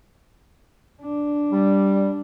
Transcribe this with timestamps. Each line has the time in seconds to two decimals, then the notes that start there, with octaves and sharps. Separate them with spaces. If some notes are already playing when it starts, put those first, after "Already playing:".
1.02 D4
1.51 G3